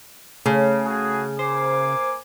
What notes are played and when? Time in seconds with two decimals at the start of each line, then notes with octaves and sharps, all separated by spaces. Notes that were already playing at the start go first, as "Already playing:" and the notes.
0.46 C#3 A3
0.86 F#4 G#4
1.39 A#3 C5 G#5 D6